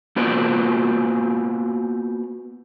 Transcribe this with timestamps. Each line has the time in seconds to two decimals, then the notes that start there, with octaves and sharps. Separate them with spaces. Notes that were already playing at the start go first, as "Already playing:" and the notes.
0.16 A#3 B3 F4 F#4 C5 D5